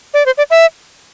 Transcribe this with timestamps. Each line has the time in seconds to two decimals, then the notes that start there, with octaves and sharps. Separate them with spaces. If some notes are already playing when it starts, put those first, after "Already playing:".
0.14 D5
0.26 C5
0.38 D5
0.51 E5